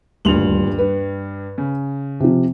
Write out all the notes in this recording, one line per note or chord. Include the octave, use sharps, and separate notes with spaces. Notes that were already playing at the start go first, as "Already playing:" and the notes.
D#1 D2 G2 C6 F7 F#7
B4
C#3
C3 F3